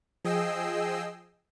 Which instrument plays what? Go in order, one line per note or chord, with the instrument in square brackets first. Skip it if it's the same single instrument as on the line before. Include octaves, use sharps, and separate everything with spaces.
[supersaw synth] F3 G#4 D#5 G5 E6 C7